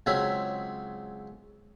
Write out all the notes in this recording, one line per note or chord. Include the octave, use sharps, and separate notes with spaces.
C#2 F#3 C4 C#4 G#4 E5